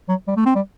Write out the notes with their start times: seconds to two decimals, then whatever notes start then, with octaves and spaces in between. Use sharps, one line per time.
0.09 F#3
0.28 G3
0.37 A3
0.46 C4
0.56 G3